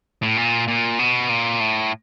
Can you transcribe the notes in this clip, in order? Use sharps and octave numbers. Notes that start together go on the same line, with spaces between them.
A2
A#2
A#2
B2
A#2
A2